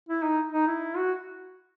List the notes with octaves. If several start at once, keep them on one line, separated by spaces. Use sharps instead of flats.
E4
D#4
D#4
E4
F#4